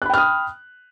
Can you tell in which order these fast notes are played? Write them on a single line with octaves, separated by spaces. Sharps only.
F#6 B5 G5 F6 D#6